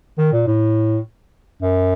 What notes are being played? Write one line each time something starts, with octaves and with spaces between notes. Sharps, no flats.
D#3
A#2
A2
F#2